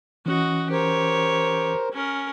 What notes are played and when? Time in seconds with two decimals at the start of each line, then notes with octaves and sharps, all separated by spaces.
0.26 E3 C#4 F#4 D#5
0.70 G4 A#4 C5 C#5
1.92 C#4 A#4